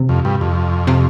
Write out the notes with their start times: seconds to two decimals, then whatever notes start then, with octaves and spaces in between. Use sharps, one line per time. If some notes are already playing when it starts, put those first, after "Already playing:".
Already playing: C3
0.09 F2
0.25 G2
0.41 F2
0.87 C3